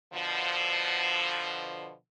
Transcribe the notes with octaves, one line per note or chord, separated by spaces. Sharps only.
B2 D3 F3